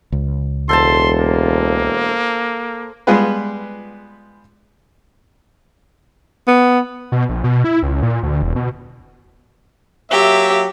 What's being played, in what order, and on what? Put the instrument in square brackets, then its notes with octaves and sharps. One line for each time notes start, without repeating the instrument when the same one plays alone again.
[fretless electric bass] C#2
[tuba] E1 [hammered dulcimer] A4 C5 A5 [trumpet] C6
[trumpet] A#3
[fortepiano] G3 G#3 B3 F4 G#4 B4
[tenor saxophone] B3
[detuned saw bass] B2
A#1
B2
E4
C#2
A#2
D2
E1
B2
[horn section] F#3 A#3 E5 [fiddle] G4